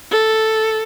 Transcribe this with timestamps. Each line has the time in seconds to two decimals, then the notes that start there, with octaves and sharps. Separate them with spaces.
0.11 A4